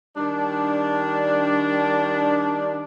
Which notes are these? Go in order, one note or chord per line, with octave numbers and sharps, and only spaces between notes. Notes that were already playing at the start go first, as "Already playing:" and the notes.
D#3 G3 D4